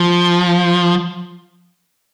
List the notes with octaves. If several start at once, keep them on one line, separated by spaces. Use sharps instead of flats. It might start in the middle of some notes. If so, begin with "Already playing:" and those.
Already playing: F3